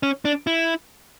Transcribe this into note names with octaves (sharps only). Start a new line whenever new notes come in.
C#4
D4
E4